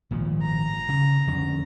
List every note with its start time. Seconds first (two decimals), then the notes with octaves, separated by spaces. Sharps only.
0.11 G#1 A#2 F3
0.43 A#5
0.89 C#3
1.27 F2 D3 C#4